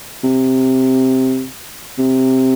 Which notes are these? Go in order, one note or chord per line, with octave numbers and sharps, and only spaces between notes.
C3
C3